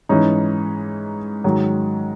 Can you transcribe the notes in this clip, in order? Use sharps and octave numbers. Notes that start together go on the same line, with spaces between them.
G#2 E3 C#4 D#4
G#2 D#3 F#3